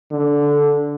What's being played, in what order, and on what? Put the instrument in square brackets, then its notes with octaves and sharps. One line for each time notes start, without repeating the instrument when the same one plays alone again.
[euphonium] D3